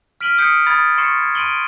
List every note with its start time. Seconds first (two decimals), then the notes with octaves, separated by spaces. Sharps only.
0.21 F6 B6 D7 D#7 F#7 G7
0.38 D#6 G6 B6 C#7 D7
0.66 B5 D#6 G#6 A6
0.98 C6 C#6 A6 C7 C#7 E7
1.19 G#6
1.35 C6 D7 D#7 F#7 G7